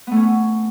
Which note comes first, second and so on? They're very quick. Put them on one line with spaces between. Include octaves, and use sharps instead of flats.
B3 A3 C#4